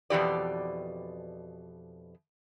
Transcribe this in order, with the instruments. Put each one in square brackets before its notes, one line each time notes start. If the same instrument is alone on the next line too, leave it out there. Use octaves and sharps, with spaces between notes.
[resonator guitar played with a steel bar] F2 B2 E3 G4 D5